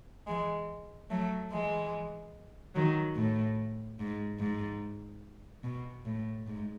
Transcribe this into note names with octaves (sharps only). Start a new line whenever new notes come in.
E3 G#3
F#3 A3
E3 G#3
D#3 F#3
A2
G#2
G#2
B2
A2
G#2